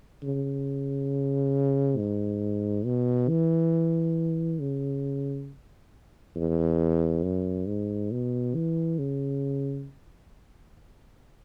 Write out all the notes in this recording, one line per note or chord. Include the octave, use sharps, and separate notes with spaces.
C#3
G#2
B2
E3
C#3
E2
F#2
G#2
B2
E3
C#3